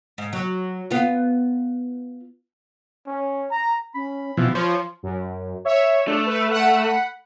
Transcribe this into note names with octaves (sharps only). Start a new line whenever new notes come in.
G#2
F#3
B3 F4
C#4
A#5
C#4 B5
B2 E3 F3 C4
F3 C#5 C6
F#2
C#5 E5
A3 D4
B4
F#5 B5